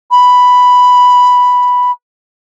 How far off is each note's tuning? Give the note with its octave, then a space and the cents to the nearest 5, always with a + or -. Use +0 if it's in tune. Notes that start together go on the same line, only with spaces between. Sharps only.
B5 +0